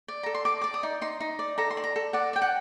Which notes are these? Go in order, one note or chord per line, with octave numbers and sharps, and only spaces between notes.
D5
A4 A#5
C6
D5 D6
D5 D6
D#6
D#4
D#4 C6
D#4
D5
A4 A#5
C6
D5
A#5
A4
D5 F#5
D5 G5
F#5